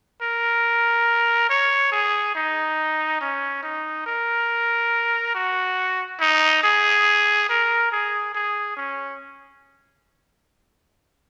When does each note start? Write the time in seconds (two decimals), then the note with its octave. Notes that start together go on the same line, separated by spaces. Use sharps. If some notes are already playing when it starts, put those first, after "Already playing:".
0.21 A#4
1.49 C#5
1.92 G#4
2.35 D#4
3.21 C#4
3.63 D#4
4.06 A#4
5.34 F#4
6.20 D#4
6.63 G#4
7.49 A#4
7.92 G#4
8.34 G#4
8.76 C#4